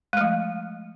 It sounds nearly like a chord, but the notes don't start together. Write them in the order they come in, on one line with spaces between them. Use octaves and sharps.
G#3 A3 F3